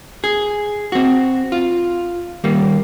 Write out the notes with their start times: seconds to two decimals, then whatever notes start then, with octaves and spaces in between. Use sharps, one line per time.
0.24 G#4
0.92 C4 F#4
1.52 F4
2.44 D#2 G3 A#3